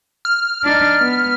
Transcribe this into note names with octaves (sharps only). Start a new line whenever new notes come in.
F6
D4 D#4
B3